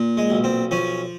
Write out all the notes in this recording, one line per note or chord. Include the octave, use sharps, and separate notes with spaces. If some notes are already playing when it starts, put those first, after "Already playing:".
Already playing: A#2
G#3
B1
C4
F3 C#4